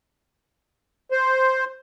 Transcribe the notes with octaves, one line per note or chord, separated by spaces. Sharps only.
C5